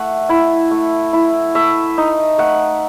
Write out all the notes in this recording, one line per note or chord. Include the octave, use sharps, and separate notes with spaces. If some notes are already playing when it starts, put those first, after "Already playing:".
Already playing: A3 F#5
E4
A3
E4
A3 E5
D#4
A3 F#5